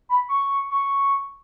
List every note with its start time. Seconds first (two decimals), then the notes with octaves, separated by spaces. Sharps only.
0.09 B5
0.29 C#6
0.70 C#6